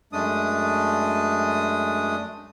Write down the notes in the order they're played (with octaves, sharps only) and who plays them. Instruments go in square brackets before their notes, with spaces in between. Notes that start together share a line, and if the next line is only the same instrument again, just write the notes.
[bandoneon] F#2 G#3 A3 D4 D#6